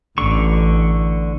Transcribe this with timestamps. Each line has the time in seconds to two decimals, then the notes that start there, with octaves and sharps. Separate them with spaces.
0.18 A1 D3 C#6